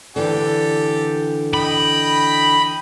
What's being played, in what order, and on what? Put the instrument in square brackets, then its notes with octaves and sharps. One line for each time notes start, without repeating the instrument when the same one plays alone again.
[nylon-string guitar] D3 E3 [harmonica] G4 A4
[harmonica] D#5 G5 [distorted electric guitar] B5